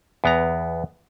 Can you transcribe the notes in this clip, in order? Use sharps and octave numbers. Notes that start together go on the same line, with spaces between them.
E2 B3 A#5